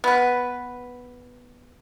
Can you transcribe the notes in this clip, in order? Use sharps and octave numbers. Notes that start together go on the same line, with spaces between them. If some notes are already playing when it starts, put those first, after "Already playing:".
B3 B4